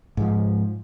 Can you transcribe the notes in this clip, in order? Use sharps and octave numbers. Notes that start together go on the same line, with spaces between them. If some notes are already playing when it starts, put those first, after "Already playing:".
G#2 F3